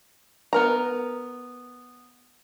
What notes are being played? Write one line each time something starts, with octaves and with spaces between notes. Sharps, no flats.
B3 A#4 A#5